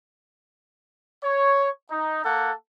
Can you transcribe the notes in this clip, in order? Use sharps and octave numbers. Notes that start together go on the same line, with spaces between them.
C#5
D#4
A#3 A4 F#5